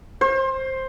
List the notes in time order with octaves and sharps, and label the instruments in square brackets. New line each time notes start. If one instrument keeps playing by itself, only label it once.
[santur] C5